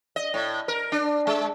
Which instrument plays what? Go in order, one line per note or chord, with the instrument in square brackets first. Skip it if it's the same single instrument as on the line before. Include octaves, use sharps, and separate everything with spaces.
[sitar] D#5
A2
A#4
D4
G#3